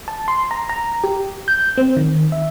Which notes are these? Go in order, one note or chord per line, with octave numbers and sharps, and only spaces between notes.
A5
C6
A#5
A#5
G4
G6
C4
D#3
E5